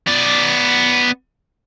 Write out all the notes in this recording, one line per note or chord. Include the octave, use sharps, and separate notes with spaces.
B3 D5